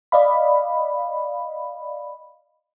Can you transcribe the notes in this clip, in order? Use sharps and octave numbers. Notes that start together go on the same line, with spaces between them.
D5 D#5 F5 B5